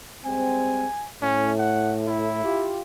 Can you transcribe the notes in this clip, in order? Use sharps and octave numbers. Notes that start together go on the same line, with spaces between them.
G3 G#3 C4 G#5
A2 C#4
F#5
E4
F4 G4